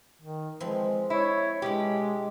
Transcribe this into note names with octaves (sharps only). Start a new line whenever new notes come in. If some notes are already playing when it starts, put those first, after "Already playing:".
D#3
E3 F3 G#3 C4
E4 C#5
B2 G#3 D4 G4 B5